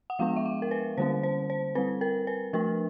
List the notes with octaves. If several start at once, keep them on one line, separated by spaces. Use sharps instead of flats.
F#5
F3 G#3 B3 D4 F5
E5
F5
A#4
B4
D3 G3 A#3 C#4 C5
C5
C5
G3 C4 B4
A#4
B4
F3 A3 D4 A#4